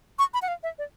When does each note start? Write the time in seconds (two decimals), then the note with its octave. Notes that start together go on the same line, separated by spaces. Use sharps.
0.19 C#6
0.34 B5
0.42 F#5
0.48 F5
0.63 E5
0.78 D5